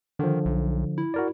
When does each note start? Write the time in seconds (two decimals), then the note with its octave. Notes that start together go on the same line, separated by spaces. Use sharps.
0.19 D3 D#3 F3
0.45 B1
0.98 E4
1.14 F#4 A#4 D5